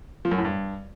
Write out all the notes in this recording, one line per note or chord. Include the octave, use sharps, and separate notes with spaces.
F3
F#2
A2
G2